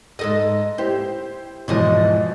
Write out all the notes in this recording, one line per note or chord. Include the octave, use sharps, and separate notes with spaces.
G#2 A4 D#5 A#6
E4 G4 C5
E2 G#2 B2 E3 F3 D#5